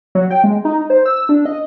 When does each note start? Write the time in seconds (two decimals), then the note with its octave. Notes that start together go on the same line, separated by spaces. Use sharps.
0.15 F#3
0.30 G5
0.44 G#3
0.65 D#4
0.90 C5
1.06 E6
1.29 D4
1.45 D#5